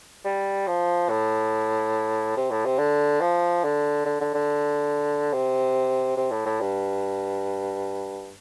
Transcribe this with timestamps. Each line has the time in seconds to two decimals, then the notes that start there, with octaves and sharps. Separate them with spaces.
0.25 G3
0.68 F3
1.09 A2
2.37 C3
2.51 A2
2.65 C3
2.78 D3
3.21 F3
3.64 D3
4.05 D3
4.21 D3
4.34 D3
5.33 C3
6.17 C3
6.31 A2
6.45 A2
6.61 G2